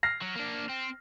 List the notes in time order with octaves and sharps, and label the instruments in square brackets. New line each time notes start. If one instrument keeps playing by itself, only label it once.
[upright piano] F6 A#6 C7
[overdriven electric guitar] F#3
A#3 D4
C4